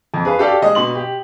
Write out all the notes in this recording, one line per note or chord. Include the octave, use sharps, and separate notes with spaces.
F2
G#4 B4 F5
F#4 G4 A4 D5 F5
G#3 D#5
B2 C6 F#7
G4